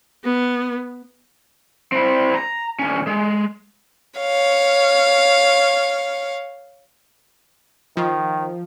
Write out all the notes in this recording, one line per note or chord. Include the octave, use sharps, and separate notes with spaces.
B3
C4 E4
A#5
D2 C#4
G#3
C#5 F5
D#3 F3